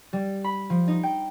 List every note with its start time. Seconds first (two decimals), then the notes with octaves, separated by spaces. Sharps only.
0.13 G3
0.44 B5
0.70 F3
0.88 D#4
1.03 G5